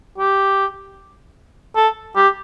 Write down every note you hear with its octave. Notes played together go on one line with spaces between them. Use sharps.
G4
A4
G4